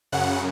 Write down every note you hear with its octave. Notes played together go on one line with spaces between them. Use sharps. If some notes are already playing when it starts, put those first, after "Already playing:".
F#2 C#3 F#5